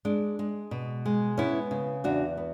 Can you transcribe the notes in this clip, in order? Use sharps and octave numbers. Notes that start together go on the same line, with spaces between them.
G#3 D4
G#3
B2
G#3
B3 C#4 E4
C#3
E2 D4 F#4
B3